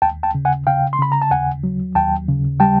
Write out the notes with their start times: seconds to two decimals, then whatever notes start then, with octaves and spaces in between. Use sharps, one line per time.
0.02 D#2 G5 A5
0.23 G5 A5
0.35 C#3
0.45 F#5 G#5
0.67 C#3 F5 G5
0.93 C6
0.99 C#3 B5
1.12 A#5
1.22 A5
1.31 D#2 F#5 G#5
1.64 F#3
1.95 D#2 G5 A5
2.28 C#3
2.60 G3 G5 A5